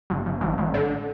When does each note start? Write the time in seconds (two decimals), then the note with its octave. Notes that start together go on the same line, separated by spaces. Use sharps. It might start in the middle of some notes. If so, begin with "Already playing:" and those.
0.10 G1
0.26 G1
0.41 A1
0.58 A1
0.74 D3